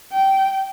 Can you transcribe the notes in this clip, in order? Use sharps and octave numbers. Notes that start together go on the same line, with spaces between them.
G5